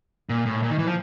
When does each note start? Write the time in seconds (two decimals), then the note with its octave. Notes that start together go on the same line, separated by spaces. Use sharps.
0.29 A#2
0.46 A2
0.63 A#2
0.71 D#3
0.78 E3
0.87 F3